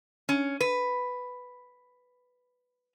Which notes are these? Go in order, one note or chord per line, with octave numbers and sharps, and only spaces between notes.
C#4
B4